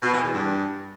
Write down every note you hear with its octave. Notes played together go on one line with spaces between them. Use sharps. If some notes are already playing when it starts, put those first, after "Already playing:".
B2
E3
E2
G2